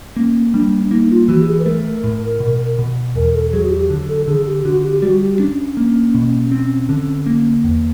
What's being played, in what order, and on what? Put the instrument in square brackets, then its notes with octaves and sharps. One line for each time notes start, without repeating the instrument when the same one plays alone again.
[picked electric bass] A#3 [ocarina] C#4
[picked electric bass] G3 [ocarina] D4
[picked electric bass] A#3 [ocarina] D#4
[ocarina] F4
[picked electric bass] E3 [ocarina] F#4
[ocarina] G4
G#4
B4
[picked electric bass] A3 [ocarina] A#4
[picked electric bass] A2
B2
B2
[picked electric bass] E2 [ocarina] A#4
[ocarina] A4
[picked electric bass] F#3 [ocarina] G#4
[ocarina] F#4
G4
[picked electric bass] D3
[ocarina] A4
[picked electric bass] D3 [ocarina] G#4
[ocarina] G4
[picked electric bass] D3 [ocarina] F#4
[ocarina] G4
[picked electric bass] G3 [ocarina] F#4
[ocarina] G4
[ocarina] C#4 [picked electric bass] D4
[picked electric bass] A#3
B2
C4
D3
A#3
E2